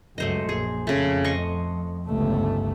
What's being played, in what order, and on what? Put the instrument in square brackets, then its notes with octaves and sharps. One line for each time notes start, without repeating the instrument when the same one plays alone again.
[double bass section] C#2 F#2 [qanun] A3 C5 D#5
[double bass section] A#1 [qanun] G#4
[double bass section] F2 [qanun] C#3 A3
[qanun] D#5 C6 C#6
[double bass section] G1 C#2 A3